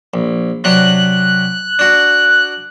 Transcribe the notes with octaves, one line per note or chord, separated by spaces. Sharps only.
A#1
C3 F#3 D4 F#6
D4 F#4